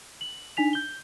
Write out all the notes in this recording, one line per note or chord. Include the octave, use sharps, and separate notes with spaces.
F#7
D4 D#4 G#5 B6 F7
G6 G7